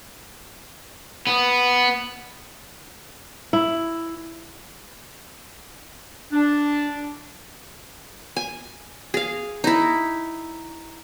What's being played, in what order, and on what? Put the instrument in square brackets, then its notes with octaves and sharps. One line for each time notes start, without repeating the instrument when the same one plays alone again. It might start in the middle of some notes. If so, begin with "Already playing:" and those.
[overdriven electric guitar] B3
[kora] E4
[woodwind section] D4
[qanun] G#5
G#4 F5
D#4 E4